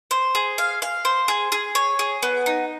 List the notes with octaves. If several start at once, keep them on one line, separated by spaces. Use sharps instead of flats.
C5
G#4
F5
F5
C5
G#4
G#4
C#5
G#4
B3
D#4